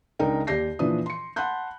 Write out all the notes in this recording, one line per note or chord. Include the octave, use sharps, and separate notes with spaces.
C#2 D4 D#4 A#4 G5
D#2 G4 D5 G6 A#6 C7
A#2 E3 F3 D4 B4 D#6
C6 C#7
F#5 A5 B5 C6 F#6 G6